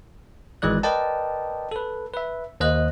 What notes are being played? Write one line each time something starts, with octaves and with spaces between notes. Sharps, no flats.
G#1 E3 G#3 D5 F#6
A#4 B4 D5 D#5 G5 A5
A4 B4
B4 E5
D#2 C5 D#5 F#6